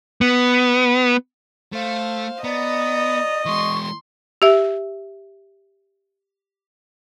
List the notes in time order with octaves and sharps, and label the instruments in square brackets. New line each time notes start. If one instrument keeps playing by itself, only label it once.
[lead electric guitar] B3
[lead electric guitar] A3 [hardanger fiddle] C5 F5
[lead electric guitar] B3 [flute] D5 [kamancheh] D#5 [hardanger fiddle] A#5
[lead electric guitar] E3 G#3 [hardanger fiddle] C6 [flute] C#6
[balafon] G4 E5